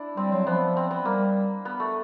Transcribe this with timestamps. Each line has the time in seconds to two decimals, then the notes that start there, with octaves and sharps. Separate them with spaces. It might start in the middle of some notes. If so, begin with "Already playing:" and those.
Already playing: D4 E4
0.17 G3 C4
0.32 F#3 C4
0.47 F3 B3
0.77 C4
0.91 B3
1.05 G3 A#3
1.65 B3
1.80 A3